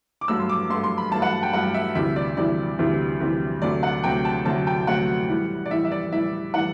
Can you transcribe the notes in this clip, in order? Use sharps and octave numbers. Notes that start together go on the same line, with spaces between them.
D6
G2 F#3 A3 E6
C6
D6
G2 F#3 A3 C6
C6
B5
G2 F#3 A3 A5
F#5
G5
G2 F#3 A3 F#5
E5
D2 C3 E3 G3 E5
D5
D2 C3 E3 G3 D5
D2 C3 E3 G3
D2 C3 E3 G3
D2 C3 F#3 A3 D5
F#5
D2 C3 F#3 A3 G5
A5
D2 C3 F#3 A3 A5
G5
D2 C3 F#3 A3 F#5
A2 E3 G3
D5
A2 E3 G3 E5
E5
D5
A2 E3 G3 E5
A2 E3 G3 F#5